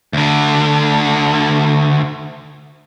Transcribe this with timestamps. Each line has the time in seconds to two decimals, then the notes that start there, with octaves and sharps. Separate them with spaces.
0.13 D2 D3